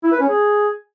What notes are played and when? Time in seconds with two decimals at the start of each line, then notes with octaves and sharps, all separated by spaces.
0.03 E4
0.12 B4
0.20 C#4
0.29 G#4